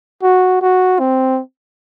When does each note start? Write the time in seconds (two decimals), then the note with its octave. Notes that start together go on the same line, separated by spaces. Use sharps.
0.23 F#4
0.62 F#4
1.00 C4